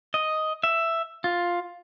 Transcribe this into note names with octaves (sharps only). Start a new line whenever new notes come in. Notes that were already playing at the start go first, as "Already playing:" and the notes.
D#5
E5
F4